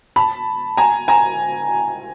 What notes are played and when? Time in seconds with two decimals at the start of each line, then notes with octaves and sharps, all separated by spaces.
0.16 A5 B5
0.77 G#5 A#5
1.08 G#5 A#5